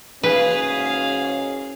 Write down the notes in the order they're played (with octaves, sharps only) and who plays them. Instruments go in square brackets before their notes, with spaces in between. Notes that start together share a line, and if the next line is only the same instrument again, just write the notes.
[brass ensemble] F#1 G#2 C#4 [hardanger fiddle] G#4 F5 [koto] B4